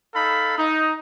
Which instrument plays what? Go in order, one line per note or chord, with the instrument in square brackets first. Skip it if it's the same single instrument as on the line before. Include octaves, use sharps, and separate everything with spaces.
[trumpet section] D#4 A4 F5 B5
D#4